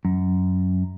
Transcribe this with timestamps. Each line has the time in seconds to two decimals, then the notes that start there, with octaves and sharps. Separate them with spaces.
0.05 F#2